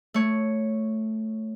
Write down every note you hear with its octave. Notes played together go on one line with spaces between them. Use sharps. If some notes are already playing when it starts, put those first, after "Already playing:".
A3 C#5